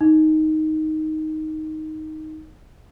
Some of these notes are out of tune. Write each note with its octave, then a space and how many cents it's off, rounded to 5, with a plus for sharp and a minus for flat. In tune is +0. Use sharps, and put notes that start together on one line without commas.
D#4 +5